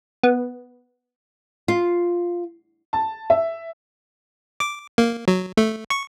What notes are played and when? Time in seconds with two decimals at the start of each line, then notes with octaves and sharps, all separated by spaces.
0.23 B3
1.68 F4
2.93 A5
3.30 E5
4.60 D6
4.98 A#3
5.28 F#3
5.57 A3
5.90 C#6